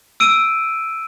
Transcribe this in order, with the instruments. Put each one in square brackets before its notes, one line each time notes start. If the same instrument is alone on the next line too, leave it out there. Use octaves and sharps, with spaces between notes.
[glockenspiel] E6 D7 D#7